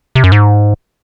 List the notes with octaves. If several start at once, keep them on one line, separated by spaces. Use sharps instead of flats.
C3
F#2
G#2